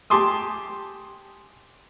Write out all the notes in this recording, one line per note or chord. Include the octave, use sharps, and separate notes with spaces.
G4 G#5 A5 C6 D6 D#6